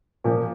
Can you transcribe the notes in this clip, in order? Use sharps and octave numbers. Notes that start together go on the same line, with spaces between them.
A#2 F3